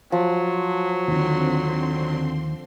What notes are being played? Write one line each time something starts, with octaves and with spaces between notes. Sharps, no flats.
F3 F#3
D#2 D3 D#3 C4 C6